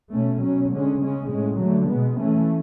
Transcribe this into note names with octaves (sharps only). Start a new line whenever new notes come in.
B2 A3 C#4
B2 F#3 C#4
D3 G#3 C#4
C#3 G#3 C#4
A2 G#3 C#4
D3 F#3 A3
B2 G#3 B3
E3 A3 C#4